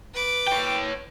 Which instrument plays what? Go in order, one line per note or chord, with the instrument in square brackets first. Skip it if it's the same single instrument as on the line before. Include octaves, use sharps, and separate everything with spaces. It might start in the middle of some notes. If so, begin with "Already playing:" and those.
[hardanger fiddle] B4 D6
[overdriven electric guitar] C#5 G5